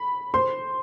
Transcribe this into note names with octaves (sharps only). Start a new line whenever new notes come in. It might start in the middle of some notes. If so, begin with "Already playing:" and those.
Already playing: B5
C5 C6